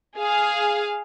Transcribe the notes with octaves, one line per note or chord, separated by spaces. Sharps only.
G#4 F5